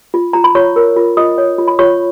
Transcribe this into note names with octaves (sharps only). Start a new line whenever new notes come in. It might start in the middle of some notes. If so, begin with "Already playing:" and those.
F4
F4 A#5
B5
F4 C#5 C#6
A#4
F4
F4 D#5 D#6
C#5
F4
B5
F4 C#5 C#6